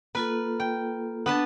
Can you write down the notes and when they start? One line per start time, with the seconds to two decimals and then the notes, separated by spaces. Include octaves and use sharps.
0.15 A#3 F4 A4 B4
0.60 G5
1.26 B3 D4 B4 A5